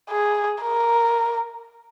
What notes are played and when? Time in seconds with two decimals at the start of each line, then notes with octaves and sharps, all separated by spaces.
0.10 G#4
0.63 A#4